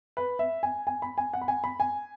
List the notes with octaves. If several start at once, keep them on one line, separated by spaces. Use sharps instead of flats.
B4
E5
G#5
G#5
B5
G#5
F#5
B5
G#5
B5
G#5